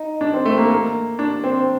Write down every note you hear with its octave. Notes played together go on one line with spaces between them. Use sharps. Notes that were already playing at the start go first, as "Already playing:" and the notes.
Already playing: D#4
D4
C4
A3
A#3
A#3
D4
C4